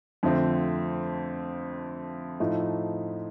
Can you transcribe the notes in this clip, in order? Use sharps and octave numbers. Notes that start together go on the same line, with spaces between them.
F2 D3 F3 A3 C4
A2 F3 A3 D#4